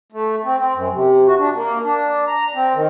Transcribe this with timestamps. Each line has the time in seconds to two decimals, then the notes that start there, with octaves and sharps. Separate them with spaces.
0.12 A3
0.45 C4
0.60 C4
0.74 F#2
0.93 C3
1.27 F#4
1.39 D4
1.54 A#3
1.84 D4
2.27 A#5
2.55 C4
2.74 D#3